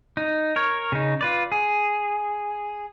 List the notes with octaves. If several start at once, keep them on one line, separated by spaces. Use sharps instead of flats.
D#4
A#4 C#5
C#3 D#4
F4 B4 D5
G#4